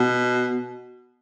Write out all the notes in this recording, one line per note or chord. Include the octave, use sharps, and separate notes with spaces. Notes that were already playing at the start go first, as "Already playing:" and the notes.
Already playing: B2